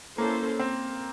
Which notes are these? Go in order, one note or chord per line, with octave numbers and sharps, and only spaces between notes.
A#3 C#4 E4 A4 C5
C4